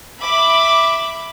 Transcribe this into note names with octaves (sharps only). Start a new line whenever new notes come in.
E5 B5 D6